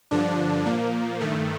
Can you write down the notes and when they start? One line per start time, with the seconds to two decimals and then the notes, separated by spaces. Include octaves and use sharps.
0.11 G2 D3 F3 D4
0.66 A#2 F3 A#3
1.20 G2 D#3 A3